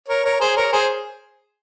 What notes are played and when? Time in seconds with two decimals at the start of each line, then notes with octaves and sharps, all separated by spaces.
0.08 A#4 C#5
0.24 A#4 C#5
0.40 G#4 C5
0.57 A#4 C#5
0.72 G#4 C5